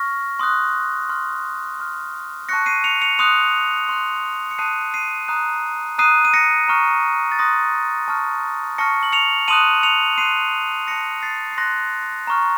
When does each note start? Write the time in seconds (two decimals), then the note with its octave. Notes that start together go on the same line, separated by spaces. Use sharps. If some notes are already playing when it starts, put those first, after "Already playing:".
Already playing: C#6 F6 A#6
0.39 C6 D#6 F#6
1.09 C6 F6
1.80 C6 F6
2.49 A5 C#6 F#6 A#6 C#7
2.66 C7 D#7
2.84 C#7 F7
3.02 C#7 F7
3.19 C6 D#6 F#6 C#7 F7
3.89 C6 F#6
4.51 C#7
4.58 A5 D#6 F#6 C7 D#7
4.94 C7 D#7
5.28 A#5 D#6 F#6
5.98 A#5 D#6 F#6 C7 D#7
6.25 D#7
6.34 A#6 C#7
6.68 A#5 C#6 F6
7.32 A6
7.39 C6 D#6 F#6 A#6
8.08 A5 C#6 F6
8.78 A5 C#6 F6 A#6 C#7
9.03 F#7
9.12 C#7 F7
9.48 A5 C6 D#6 F#6 D#7 F#7
9.83 C#7 F7
10.18 C6 F#6 C7 D#7
10.87 A5 C6 F#6 A#6 C#7
11.23 A6 C7
11.52 C7
11.58 C6 F#6 A#6
12.27 A#5 C#6 F6